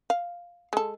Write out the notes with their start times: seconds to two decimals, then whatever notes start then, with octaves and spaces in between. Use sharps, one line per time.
0.10 F5
0.73 G#3 A4